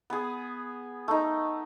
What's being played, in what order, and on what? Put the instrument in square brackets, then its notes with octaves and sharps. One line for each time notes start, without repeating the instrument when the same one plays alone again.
[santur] B3 G#4
A3 D#4